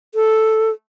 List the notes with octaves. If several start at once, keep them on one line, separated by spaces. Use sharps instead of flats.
A4